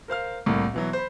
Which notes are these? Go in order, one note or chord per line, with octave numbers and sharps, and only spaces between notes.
A#4 C5 F5 F6
C2 A2 A#3
B2 E3 F#3
C5 B5